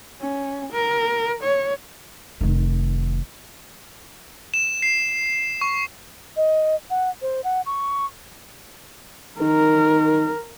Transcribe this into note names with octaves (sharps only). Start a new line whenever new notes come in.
C#4
A#4
C#5
F1 D#3
E7
C7
C#6
D#5
F#5
C5
F#5
C#6
D#3 A#4